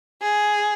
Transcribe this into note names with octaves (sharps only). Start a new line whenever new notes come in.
G#4